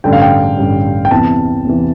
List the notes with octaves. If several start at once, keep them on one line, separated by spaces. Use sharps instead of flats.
A1 G2 D3 G5
F5
G5
A1 G2 D3
G5
E2 C3 E3 A5
E2 C3 E3